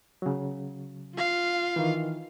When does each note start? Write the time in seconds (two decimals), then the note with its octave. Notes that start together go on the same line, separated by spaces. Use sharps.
0.22 C#3 F#3
1.16 F4 F5
1.76 D#3 E3